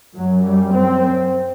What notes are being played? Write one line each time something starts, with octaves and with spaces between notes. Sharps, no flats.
F#2 F#3
G3
C4